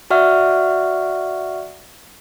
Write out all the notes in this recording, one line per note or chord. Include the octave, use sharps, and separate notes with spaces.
F#4 D5 E5 F#5 C#6 F6